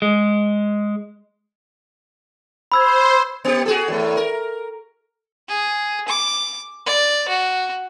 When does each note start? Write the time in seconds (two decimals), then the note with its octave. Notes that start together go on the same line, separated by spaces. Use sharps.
0.02 G#3
2.72 C5 B5 E6 G#6
3.45 A#3 G4
3.66 F#4 G#4 A4
3.88 E2 A2 A3
4.17 A#4
5.49 G#4
6.08 D6
6.86 D5
7.29 F#4